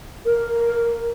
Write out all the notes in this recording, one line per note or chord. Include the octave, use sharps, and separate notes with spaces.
A#4